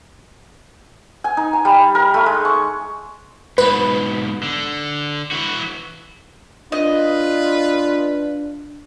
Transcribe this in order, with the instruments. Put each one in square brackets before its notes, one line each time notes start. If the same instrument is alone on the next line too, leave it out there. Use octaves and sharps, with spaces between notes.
[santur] G#5
D#4
G#5
G3
A#4
A3
G#3
C#6
[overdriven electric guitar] G#2 B2 [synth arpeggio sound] B4
[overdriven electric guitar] D3
E3 F#4
[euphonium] D4 [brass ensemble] F4 B4 [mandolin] D#5